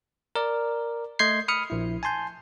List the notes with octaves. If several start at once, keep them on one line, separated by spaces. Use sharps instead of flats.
A#4 D5
A3 D#5 C6 G6 G#6 C7
B5 D#6 F6 C#7
A#1 E4
G#5 A5 C6 G6